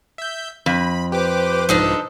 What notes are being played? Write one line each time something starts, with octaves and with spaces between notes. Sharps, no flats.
E5 G6
F2 B5
G4 B4 C5 D6
C2 G#2 F3 D4 D#4 A4